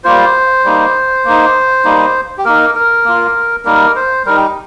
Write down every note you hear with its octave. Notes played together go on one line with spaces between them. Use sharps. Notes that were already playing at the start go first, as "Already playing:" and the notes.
G3 A#3 F4 C5
G3 A#3 D#4
A#3 D#4
G3 A#3 D#4
G4
A#3 D#4 A#4
A#4
A#3 F4
G3 A#3 D#4 A#4
C5
G3 D#4 A#4
G4